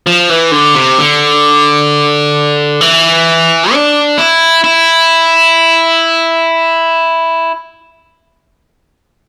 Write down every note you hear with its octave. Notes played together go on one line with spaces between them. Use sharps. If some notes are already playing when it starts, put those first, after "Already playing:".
F3
E3
D3
C3
D3
E3
D4
E4
E4